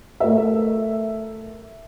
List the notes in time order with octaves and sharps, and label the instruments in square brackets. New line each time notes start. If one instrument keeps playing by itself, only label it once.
[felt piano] A3 A#4 E5